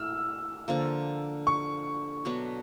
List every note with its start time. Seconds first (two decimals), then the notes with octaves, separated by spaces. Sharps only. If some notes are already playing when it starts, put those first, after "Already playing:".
Already playing: A3 E4 E6 F6
0.68 D3 F3 A#3
1.47 C#6
2.25 B2 F#3 B3 D4